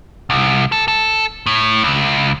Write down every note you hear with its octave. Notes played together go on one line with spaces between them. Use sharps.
C2
A4
A4
A2
C#2